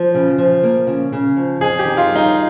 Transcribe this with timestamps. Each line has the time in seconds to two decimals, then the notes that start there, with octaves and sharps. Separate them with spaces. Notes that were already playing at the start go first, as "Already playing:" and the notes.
Already playing: F3
0.14 C#3
0.38 F3
0.63 A#3
0.87 C#3
1.12 C#3
1.36 F3
1.61 F2 G#4
1.79 G4
1.85 D#3
1.97 F4
2.09 G3
2.16 D#4